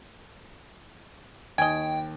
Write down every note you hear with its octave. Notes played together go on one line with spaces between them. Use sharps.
D#2 D#5 G5 G#5